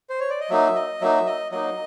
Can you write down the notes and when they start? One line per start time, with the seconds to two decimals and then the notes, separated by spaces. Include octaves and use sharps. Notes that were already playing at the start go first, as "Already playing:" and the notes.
0.10 C5
0.20 C#5
0.30 D5
0.40 D#5
0.50 F#3 A#3 D#4 E5
0.75 D#5
1.01 F#3 A#3 D#4 E5
1.26 D#5
1.52 F#3 A#3 D#4 D#5